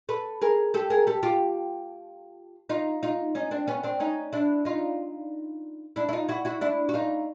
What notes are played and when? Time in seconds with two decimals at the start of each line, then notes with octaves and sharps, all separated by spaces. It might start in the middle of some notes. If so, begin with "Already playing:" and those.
0.09 A4 B4
0.42 G#4 A#4
0.74 G4 A4
0.90 G#4 A#4
1.07 G4 A4
1.23 F4 G4
2.69 D#4 F4
3.03 D#4 F4
3.35 C#4 D#4
3.51 C4 D4
3.67 B3 C#4
3.84 C4 D4
4.00 C#4 D#4
4.33 D4 E4
4.65 D#4 F4
5.96 D4 E4
6.09 E4
6.13 D#4 F4
6.28 E4 F#4
6.45 E4 F#4
6.61 D4 E4
6.89 F#4
6.94 D#4 F4